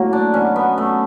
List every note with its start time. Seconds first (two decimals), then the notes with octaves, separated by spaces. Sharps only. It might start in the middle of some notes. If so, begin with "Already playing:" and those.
Already playing: A2 F#3 A#3
0.13 D4
0.34 B2 F#3 C#4
0.56 B3
0.78 A3